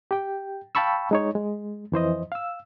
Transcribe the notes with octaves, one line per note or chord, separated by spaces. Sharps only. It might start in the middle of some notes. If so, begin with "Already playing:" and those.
G4 G5
F5 G5 A5 B5 C#6 E6
G#3 D#4 C#5
G#3
F2 E3 C5 D#5
F5 E6